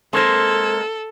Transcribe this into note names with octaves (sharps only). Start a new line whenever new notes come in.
G#3 A#3 C4 A4 C5